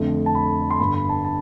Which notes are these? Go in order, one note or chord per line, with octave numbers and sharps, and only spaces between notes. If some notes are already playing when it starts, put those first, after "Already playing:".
Already playing: F2 D3 A3
A5
B5
C6
G1 G2 D3 B5
B5
A5
A5